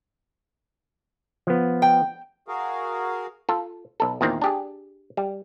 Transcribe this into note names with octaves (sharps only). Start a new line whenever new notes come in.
F3 B3
G5
F#4 G#4 A#4 F5
F4 A4
B1 A4
E2 A#2 D#3 C4
D4 G4 G#4
G3